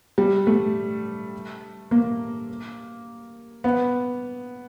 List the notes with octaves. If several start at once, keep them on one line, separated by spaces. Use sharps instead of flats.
G3
A3
A#3
B3